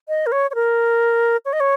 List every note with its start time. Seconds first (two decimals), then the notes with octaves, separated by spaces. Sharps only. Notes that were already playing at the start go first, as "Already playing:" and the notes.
0.09 D#5
0.26 A#4
0.32 C#5
0.51 C#5
0.55 A#4
1.45 C#5
1.53 D#5
1.60 C#5